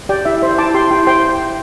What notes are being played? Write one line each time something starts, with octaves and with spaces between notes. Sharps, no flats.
G4 D5 G5
E4 E5
C5 E5
E4 A5 D6
G4 G5 C6
E4 G5 C6
C5 G5 C6